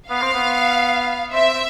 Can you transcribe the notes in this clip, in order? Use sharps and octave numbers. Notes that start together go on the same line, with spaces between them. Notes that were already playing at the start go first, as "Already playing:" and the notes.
B3 F5
C4
B3
C4 E5
C4